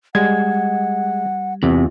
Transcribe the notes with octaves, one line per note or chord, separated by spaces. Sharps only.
G3 G#3 F#5 G#6
E2 C3 F4